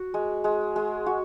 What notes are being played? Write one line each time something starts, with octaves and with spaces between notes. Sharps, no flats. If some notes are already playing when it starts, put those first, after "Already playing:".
Already playing: F#4
G#3
G#3
G#3
F#4